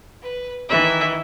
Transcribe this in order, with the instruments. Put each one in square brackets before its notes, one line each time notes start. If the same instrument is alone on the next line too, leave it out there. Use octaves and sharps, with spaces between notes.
[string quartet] B4
[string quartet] D#3 E3 [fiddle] E5